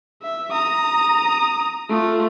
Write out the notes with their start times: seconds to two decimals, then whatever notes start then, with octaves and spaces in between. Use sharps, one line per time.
0.23 E5
0.52 A#5 D#6
1.89 A3 F4